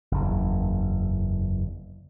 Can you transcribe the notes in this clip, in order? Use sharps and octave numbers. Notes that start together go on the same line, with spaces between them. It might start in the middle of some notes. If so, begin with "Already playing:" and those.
F#1 E2